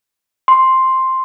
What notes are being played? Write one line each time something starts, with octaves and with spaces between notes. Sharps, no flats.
C6